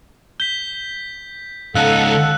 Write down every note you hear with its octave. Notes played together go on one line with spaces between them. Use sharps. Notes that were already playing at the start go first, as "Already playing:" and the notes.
G6 B6 G7
C#2 D#4 A4 F5 F#5 E6 F#6